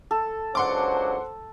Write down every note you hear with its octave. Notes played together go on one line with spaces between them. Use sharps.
A4
C#2 F#3 D4 C5 F#5 C6 D6